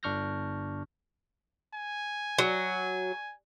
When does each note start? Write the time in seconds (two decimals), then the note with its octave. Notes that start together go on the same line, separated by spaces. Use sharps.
0.03 G1 D4 C#6 F6 G6 A#6
1.74 G#5
2.38 F#3